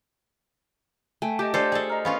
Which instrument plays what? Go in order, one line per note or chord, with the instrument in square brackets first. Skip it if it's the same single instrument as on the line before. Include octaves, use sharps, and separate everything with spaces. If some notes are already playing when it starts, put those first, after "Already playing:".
[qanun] A3 [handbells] G5 G#5
[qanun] G4 [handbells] D#5 A5 D6
[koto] D4 F4 A4 [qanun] C5 [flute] D5
[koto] G#4 A4
[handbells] D#5 F6 [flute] A#5
[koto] B3 C#4 F4 [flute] F5